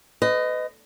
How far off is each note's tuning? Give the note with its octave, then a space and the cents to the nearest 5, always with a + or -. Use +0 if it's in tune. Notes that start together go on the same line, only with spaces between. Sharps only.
B4 +35 D#5 +0